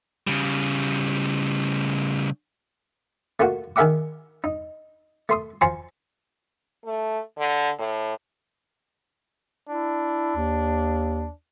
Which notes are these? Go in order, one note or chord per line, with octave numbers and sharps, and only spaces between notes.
C#3 G3
A3 A#3 F4 F#4
D#3 G#4 A#4 E5 F#5 D6
D#4
A3 C6 D#6
F3 G#5 A#5 C6 C#6
A3
D3
A2
D4 E4
D#2